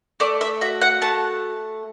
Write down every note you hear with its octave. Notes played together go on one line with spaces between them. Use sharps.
A3 D5
E5
F#4 E5
F#5
A3 A5